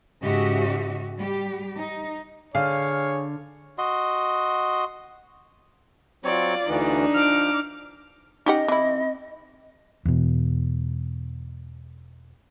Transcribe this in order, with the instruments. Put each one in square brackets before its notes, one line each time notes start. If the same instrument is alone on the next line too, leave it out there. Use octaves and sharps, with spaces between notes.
[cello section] G#2 C#3 F#4 G4 D#5 E5
G3 G4
D#4
[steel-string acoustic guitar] D3 [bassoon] G#4 [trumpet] C#5 [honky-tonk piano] F5
[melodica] F#4 D#5 C6
[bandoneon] F#3 C4 C#5 [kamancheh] F4 D5
[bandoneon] D2 E3 [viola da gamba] D4 D#4
[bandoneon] F3 [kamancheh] D6 F6
[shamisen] C#4 G4 F#5 [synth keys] D#4 [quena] D#5
[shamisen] E3 E4 [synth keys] C4
[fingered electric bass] E2 B2